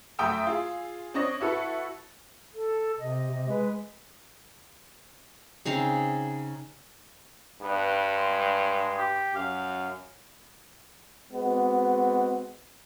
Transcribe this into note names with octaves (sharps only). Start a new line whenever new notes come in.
F#2 A3 E5 G5 D#6 E6
F4 G#4
C4 D4 C#5 D#5
E4 F#4 A4 B4
A4
C3 D#5
C3
G#3 B4
C#3 C4 D#4 F5
G2 B3
G#3
G4
F#2 F5
G#3 B3 C4 F#4